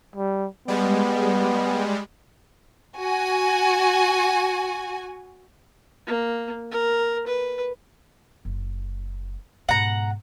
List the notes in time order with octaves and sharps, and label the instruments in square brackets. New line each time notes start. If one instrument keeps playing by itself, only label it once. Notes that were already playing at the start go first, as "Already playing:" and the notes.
[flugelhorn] G3
[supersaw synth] G3 G#3 [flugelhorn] B3
[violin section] F#4 G#5
[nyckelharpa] A#3
A#4
B4
[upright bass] F#1
[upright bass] G#2 B2 [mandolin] F#5 A#5